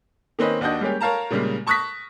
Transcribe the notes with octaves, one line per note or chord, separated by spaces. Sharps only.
D#3 A#3 C4 C#4 B4 D#5
D#2 D4 F#4 D#5 G6
G3 G#3 A#3 C#4 G4
A#4 C#5 F5 A5 A#5
A#2 C#3 G3 G#3
A5 C#6 D#6 F#6 A#6 B6